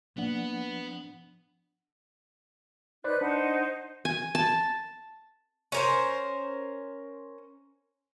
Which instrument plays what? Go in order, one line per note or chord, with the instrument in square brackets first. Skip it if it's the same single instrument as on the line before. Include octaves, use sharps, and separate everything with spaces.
[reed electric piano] F3 D4 F#5 [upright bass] A#3 [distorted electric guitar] B3
[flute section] D#4 B4 F#6 [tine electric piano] C5 D5 B5
[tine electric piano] D4 [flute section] D#4 C5 F#5
[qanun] G#5
A5
[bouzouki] C#4 A#4 C5